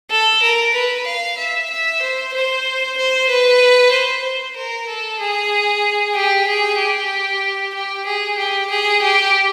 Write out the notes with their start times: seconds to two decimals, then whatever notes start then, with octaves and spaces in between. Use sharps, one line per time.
0.11 A4
0.43 A#4
0.74 B4
1.06 F5
1.38 E5
1.70 E5
2.02 C5
2.33 C5
2.97 C5
3.29 B4
3.92 C5
4.24 C5
4.56 A#4
4.88 A4
5.20 G#4
6.15 G4
6.47 G#4
6.79 G4
7.74 G4
8.06 G#4
8.38 G4
8.70 G#4
9.02 G4